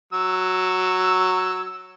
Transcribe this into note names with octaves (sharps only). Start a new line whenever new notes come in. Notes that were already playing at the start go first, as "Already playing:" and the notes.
F#3 E6